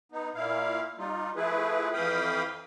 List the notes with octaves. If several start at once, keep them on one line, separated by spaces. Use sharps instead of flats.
B3 D#4
A#2 E4 F5
G3 D#4 F4
F3 A3 E4 G#4 B4
F2 E3 F5 G5 B5 D#6